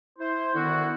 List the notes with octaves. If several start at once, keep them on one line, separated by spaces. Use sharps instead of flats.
E4 C5
D3 D#3 B3 E4 F#4